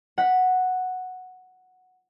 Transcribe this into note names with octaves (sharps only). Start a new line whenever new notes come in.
F#5 B6